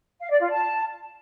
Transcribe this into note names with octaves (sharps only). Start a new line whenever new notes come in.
F5
D5
F4
A5